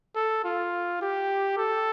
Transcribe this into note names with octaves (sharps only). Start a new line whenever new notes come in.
A4
F4
G4
A4